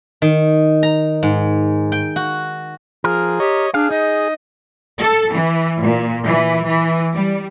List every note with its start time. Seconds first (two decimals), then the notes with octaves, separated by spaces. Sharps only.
0.22 D#3
0.83 A#5
1.23 G#2
1.92 G5
2.16 F#4
3.04 F3 G#4 A#4
3.40 G4 C#5 D#5
3.74 D4 G#4 F5
3.91 D#4 D#5
5.00 A4
5.32 E3
5.81 A#2
6.26 E3
6.66 E3
7.14 G3